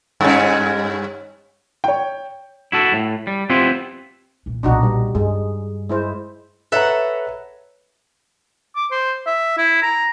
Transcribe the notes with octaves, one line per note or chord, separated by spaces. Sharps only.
G2 C#4
C#5 G5
E4 F#4 A4
A2
G3
B3 C4 E4 F4 G4 C5
A#2 E3
B1 A#2 D4 D#4 F#4
G3
G2 G#3
G#3 E4 C5
A4 B4 C#5 E5 F#5 A#5
D6
C5
E5
E4
A#5